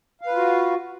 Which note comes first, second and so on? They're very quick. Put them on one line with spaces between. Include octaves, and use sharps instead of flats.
F5 B4 F4 F#4